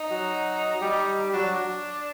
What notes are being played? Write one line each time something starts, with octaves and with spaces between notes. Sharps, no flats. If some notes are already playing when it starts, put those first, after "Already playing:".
Already playing: D#4
F#3 F#4
G3 G4
F#3 D4 F#4